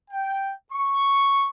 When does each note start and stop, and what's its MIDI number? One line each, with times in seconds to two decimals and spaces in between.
0.11 0.52 79
0.72 1.48 85